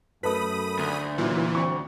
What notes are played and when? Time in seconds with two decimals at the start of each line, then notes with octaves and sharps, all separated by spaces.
0.23 F#2 A3 A4 B4 B5 D#6
0.79 D2
1.18 A#2 E3 F#3 C#4 E4
1.55 F#3 C4 C#6